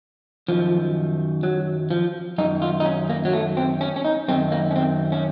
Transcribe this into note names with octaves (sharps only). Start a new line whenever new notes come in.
F#2 D#3 F3
F#3
F3
F#2 D#3 D#4
F4
D#4
C#4
A#3
F#3
A3
C4
C#4
C#4
D#4
F#2 D#3 C4
A#3
C#4
C4
C#4